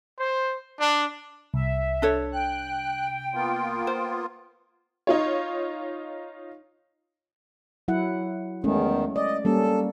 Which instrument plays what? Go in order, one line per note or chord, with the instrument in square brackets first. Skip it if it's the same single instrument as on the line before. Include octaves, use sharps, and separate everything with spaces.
[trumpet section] C5
D4
[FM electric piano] C2 [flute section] E5
[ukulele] D4 A4 C#5
[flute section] G5 [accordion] F#6
[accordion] A#3 B3 F4
[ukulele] C5
[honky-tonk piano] D#4 F4 C#5
[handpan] F#3 E4 F#5
[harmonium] E2 D#3 [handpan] G#3 A3 C#4
[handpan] D5 [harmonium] D#5
[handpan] G3 A#3 C#4 [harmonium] A4